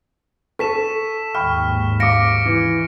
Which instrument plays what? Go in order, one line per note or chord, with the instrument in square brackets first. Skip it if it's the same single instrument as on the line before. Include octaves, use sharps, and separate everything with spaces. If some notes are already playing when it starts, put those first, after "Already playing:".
[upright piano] A4 [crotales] C#6 B6 E7
[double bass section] D#2 G#2 [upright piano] G5 B5 C#6 [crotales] F6
[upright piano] F5 D6 [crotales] A#6 C#7 D7
[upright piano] E3